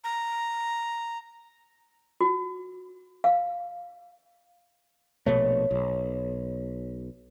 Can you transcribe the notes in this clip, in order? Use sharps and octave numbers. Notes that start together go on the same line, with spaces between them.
A#5
F#4
F5
A#1 B2 A3 C#5
B1